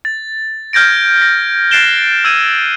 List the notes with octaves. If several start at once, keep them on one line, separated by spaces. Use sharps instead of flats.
A6
F6 G6 G#6 A#6 D7
A#6
F#6 A6 C7 D7 E7 G7
E6 G#6 D#7